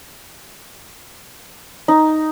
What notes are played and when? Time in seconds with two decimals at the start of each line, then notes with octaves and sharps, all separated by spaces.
1.88 D#4